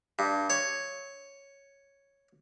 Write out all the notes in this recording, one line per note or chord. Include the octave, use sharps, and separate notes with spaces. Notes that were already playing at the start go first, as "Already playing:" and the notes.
G2
C#5